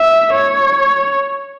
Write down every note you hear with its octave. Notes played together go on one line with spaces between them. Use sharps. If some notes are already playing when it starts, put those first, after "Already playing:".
Already playing: E5
C#5